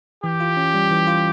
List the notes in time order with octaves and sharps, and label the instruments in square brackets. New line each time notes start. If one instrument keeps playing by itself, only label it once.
[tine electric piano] E3 [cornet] G4
[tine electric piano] F4
C#4
G3
E3
F4